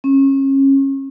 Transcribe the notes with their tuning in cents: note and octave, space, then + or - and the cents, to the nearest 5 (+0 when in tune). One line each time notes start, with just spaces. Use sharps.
C#4 -30